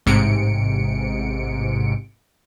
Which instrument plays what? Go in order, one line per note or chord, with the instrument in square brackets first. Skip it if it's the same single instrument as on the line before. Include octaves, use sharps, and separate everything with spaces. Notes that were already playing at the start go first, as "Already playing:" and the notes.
[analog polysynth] A1 G#2 C3 C#7 D7